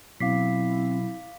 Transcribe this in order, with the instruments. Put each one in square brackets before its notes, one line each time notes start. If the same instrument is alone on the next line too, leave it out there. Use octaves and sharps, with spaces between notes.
[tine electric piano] B2 F#3 C7 [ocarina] C4 [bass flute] E4 [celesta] F5 D6 B6